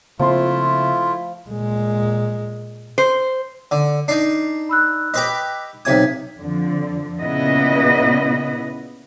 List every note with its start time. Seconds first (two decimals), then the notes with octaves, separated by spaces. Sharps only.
0.19 C#3 F3 A3 A#3 C4 E4 F4 C6
1.49 A#2 G#3
2.98 C5
3.71 D3
4.08 D4 D#4 C7
4.69 B5 E6 F#6
5.14 G4 B4 D#5
5.85 B1 C3 D#6 G#6 B6
6.39 F2 D3 F3
7.20 A#2 C#3 B3 E4 B4 D#5